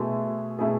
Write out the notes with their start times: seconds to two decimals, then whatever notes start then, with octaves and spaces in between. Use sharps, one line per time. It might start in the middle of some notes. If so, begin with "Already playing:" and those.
Already playing: B2 A3 E4 F#4 G#4
0.59 B2 A3 E4 G#4